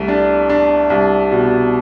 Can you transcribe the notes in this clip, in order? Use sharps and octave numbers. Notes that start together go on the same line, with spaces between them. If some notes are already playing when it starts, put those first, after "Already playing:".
Already playing: C2 A3
D4
D4
C2
B2